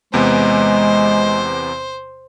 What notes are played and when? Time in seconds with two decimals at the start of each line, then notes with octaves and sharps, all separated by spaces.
0.13 E2 C3 G#3 B3 C5